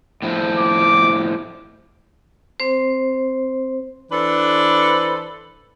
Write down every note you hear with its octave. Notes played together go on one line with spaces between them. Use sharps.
A2 F3
D6
C4 C5
E3 D4 A4 B4 C5